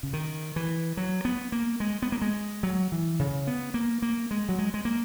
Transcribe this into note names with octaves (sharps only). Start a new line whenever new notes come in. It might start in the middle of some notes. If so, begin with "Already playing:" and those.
C#3
D#3
E3
F#3
B3
A#3
G#3
B3
A#3
G#3
F#3
E3
C#3
B3
A#3
A#3
G#3
F#3
G#3
G#3
A#3